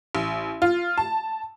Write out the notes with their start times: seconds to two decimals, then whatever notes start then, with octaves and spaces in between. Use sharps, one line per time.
0.15 A1
0.62 F4
0.98 A5